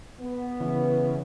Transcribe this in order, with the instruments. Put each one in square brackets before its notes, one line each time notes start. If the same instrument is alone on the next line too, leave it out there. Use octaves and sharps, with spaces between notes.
[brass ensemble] B3
[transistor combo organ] C#3 E3